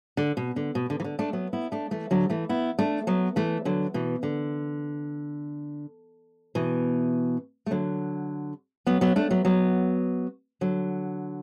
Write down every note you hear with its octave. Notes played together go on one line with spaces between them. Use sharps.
D3
B2
D3
B2
D3
E3
D3
A3 D4
F#3 B3
B3 E4
A3 D4
E3 A3
D3 F#3
E3 A3
B3 E4
A3 D4
F#3 B3
E3 A3
D3 F#3
B2 E3
D3
B2 E3
A3
D3 F#3
F#3 B3
F#3 B3
A3 D4
F#3 B3
F#3 B3
D3 F#3